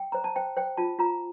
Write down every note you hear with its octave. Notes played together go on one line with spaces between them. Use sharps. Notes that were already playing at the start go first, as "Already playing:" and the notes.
Already playing: G5
C5 A#5
A5
C5 G5
C5 G5
F4 A5
F4 A#5